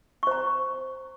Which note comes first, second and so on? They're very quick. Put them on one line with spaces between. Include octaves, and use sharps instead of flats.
C#6 C5 A#5